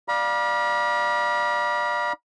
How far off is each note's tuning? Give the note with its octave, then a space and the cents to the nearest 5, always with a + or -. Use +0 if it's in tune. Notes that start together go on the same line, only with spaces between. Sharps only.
D5 +15 F5 +10 B5 -45